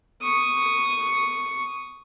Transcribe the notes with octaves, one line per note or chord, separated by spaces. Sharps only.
C#6 D#6